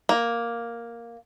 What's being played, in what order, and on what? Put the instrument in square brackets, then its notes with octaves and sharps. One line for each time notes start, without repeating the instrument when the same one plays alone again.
[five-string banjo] A#3